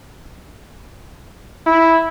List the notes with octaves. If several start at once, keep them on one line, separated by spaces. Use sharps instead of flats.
E4